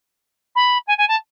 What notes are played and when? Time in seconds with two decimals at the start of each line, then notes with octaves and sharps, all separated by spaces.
0.55 B5
0.87 G#5
0.97 G#5
1.08 A5